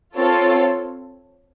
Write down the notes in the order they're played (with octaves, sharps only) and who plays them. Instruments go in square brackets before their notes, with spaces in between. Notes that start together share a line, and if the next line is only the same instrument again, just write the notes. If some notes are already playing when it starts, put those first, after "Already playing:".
[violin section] C4 F4 A4 C#5